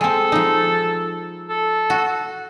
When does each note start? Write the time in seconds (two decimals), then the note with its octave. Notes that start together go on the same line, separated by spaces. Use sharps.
0.01 G#3 C4 A4
0.32 F3 D#4
1.49 A4
1.90 F#4